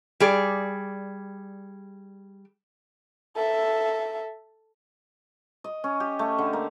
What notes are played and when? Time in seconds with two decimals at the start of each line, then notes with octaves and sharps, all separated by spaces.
0.20 G3 G#4 D5
3.36 A4 E5
5.64 D#5
5.84 C#4
6.00 G4
6.19 A3
6.38 D3
6.53 A#3